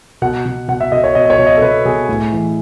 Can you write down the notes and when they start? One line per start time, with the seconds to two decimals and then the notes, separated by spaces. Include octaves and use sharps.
0.22 B2 F#5
0.45 B2
0.68 B2 F#5
0.81 E5
0.92 B2 D#5
1.04 C#5
1.15 B2 D#5
1.25 D#5
1.30 C#5
1.39 B2
1.46 D#5
1.57 A4
1.61 B2 B4
1.85 B2 G#4
2.09 A2
2.33 E3